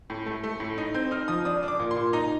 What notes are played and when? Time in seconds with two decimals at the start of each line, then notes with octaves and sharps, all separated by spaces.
0.10 A2
0.26 A3
0.44 A3
0.60 A2
0.78 D#4
0.94 C4 G6
1.11 D#4 F6
1.28 F3 D#6
1.45 D4 D#6
1.63 D4
1.68 D6
1.79 A#2
1.91 C6
1.97 A#2
2.13 D#4 A#5